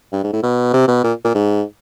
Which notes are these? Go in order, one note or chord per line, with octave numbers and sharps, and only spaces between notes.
G2
G#2
A2
B2
C3
B2
A#2
A#2
G#2